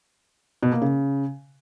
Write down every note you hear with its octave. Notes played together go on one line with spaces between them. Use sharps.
B2
A#3
C#3